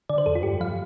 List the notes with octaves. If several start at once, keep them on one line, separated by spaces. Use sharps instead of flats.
D3 D5
C5
F2 A4
F4
G2 G4
F3 F5